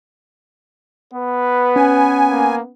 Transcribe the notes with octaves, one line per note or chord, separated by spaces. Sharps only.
B3 B4
C#4 G#5
A#3